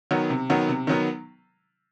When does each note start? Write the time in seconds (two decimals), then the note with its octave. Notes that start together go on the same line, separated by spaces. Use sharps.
0.11 D#3 F#3 B3
0.30 C3
0.50 D#3 F#3 B3
0.68 C3
0.87 D#3 F#3 B3